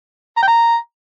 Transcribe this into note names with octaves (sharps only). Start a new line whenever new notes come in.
A#5
G5
A#5